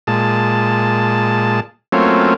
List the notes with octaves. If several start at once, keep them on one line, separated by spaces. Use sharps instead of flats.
A#2 G#3 A5
F#3 A3 A#3 C4 C#4 F4